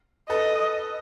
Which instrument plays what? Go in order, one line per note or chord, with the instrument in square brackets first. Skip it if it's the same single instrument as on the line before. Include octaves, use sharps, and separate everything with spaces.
[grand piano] A4 B4 [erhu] D#5